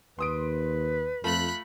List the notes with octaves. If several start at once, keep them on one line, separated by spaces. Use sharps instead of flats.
D#2 B4 C6 D#6 D7
F2 A3 F4 B5 F#6